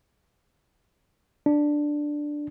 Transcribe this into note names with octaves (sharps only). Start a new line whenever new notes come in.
D4